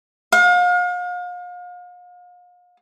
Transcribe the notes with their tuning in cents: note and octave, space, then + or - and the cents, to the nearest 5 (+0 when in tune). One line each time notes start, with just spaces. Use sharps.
F5 +40